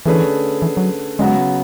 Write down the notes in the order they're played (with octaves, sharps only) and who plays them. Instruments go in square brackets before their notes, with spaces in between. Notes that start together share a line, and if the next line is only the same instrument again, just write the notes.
[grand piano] D3 A3 C#4 G#4 B4 [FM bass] E3
[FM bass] E3
F#3
[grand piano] C#3 F#3 B3 F#4 [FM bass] G#3